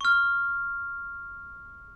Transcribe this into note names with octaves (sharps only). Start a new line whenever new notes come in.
C#6 F6